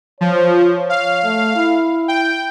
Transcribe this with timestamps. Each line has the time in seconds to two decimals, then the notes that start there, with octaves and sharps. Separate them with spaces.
0.21 F3 C#5
0.90 F5
1.24 A3
1.56 E4
2.08 G5